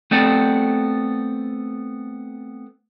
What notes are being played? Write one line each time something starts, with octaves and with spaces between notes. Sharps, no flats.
A3 B3 C4 A4 D5